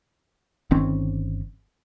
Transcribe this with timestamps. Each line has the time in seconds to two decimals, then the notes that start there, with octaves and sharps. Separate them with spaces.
0.71 G1 D#3 C4 C#4